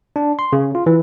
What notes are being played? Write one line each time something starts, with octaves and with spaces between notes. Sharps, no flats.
D4
C6
C#3
F4
E3